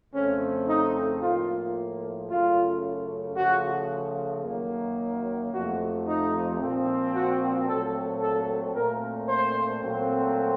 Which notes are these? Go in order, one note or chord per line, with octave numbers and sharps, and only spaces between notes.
F2 C#3 A3 C4 C#4
D#4
A2 F3 A#3 F4
F#2 C#3 A3 F4
C#3 F3 A3 F#4
F#2 D#3 F#3 A#3
F2 C3 F3 A3 F#4
D#4
A#2 F3 C4
F#4
A#2 F#3 A3 C4 A4
A4
A#2 A3 C4 A#4
C5
A#2 F#3 A3 C4